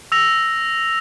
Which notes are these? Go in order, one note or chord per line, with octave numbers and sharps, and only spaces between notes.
E6 A#6 F7